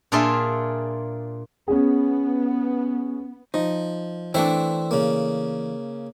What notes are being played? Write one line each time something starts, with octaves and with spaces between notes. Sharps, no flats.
A#2 D4 F4 G#4 E5 C6
B3 C#4 G#4
F3 D#4
E3 A3 C4 D4 C5 E5
C#3 A#3